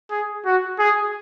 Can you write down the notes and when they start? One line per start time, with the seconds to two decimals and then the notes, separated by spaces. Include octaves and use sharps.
0.11 G#4
0.45 F#4
0.79 G#4